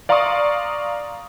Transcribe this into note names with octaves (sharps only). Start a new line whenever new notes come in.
D5 F5 A#5 C6 C#6 D#6